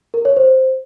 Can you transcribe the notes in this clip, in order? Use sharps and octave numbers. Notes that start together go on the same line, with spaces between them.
A#4
C#5
C5